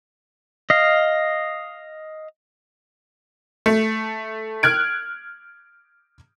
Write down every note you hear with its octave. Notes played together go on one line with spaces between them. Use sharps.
D#5 F5
A3
F6 F#6 G#6 D7